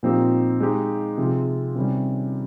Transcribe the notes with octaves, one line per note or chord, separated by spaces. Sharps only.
A#2 F3 C4 D#4 G4
G#3 D#4 G4
C3 F3 C4 F4 G#4
C3 D#3 G3 C#4